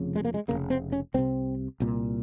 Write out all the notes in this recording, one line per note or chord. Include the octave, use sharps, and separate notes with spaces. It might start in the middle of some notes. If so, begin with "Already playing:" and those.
Already playing: F1 F2 C#3
G#3
A#3
G#3
F1 F2 C#3 A#3
C4
C#4
C2 C3 C4
C2 A#2